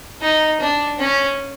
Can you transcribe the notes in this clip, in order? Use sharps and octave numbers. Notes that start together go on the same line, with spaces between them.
D#4
D4
C#4